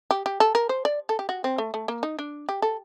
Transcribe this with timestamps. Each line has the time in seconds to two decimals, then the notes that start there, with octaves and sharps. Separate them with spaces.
0.11 G4
0.26 G4
0.40 A4
0.55 A#4
0.69 C5
0.85 D5
1.09 A4
1.19 G4
1.29 F#4
1.44 C4
1.58 A3
1.74 A3
1.88 A#3
2.03 D#4
2.19 D4
2.49 G4
2.62 A4